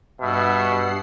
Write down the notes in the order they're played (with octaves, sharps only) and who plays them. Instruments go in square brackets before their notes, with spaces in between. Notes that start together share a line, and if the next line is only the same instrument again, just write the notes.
[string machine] G2 F#5 C7 [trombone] B2 [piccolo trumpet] E5